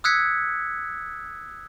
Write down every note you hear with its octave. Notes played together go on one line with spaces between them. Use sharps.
D#6 E6 F#6 G#6 B6 C#7